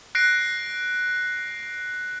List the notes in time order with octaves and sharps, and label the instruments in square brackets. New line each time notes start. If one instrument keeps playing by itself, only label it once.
[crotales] F#6 A#6 C7 D7